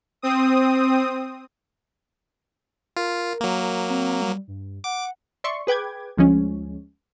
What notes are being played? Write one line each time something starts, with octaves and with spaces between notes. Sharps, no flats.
C4 D#6
F4 A#4
F#3 A#3
C4
G3
G2
F#5 D6
D5 E5 C6 C#6
G#4 B4 G5 D6 G#6
D2 F3 G#3 C#4